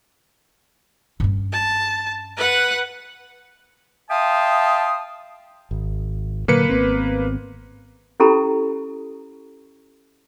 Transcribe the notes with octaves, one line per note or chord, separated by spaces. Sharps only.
G2 C#4
A5
B4 F#5
E5 F5 G5 A5 C6 D#6
G#1
A#2 D3 F#3 A#3 B4 C#7
G#1 B3 C4
C#4 E4 G4 A4 A#5 B5